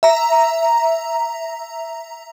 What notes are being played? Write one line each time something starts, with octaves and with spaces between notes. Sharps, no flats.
E5 A#5